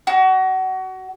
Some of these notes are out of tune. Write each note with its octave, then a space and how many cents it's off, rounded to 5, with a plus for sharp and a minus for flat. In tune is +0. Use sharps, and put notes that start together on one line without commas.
F#4 +25